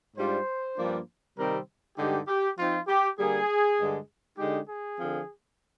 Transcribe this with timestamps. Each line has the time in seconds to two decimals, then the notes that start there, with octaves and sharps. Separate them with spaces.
0.17 G#2 G3 D4 F4 C5
0.77 G2 F3 A#3 D4 F4
1.37 C3 D#3 G3 C4 D#4 A#4
1.98 G2 D3 G#3 D#4 G4
2.28 G4
2.57 F3 C4 D#4 F4
2.88 G4
3.18 D3 G3 A#3 G#4
3.78 G2 D3 G#3
4.38 D3 G#3 D#4 G4
4.68 G#4
4.98 D3 F3 C4